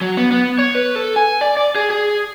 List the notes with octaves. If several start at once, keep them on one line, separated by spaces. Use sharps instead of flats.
F#3
B3
B3
C#5
B4
A4
G#5
D5
D5
G#4
G#4